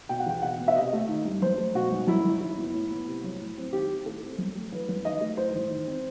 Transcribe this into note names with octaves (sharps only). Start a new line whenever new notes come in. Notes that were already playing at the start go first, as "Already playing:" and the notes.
B2 G5
F#5
E2 G5
B2 F#5
B3
E5
C3 D#5
A3
D#3
G2
F#2 C5
A3
B2 F#4
B1
F#2 E4
F#1
D#3 E4
B3
A2
B3
C3
F#3
A2
C4
D#3 G4
C4
A2 A4
C4
F#2
A3
E3 B4
F#2 B4
D#3 D#5
A3
A2 C5
A1
D#3
C4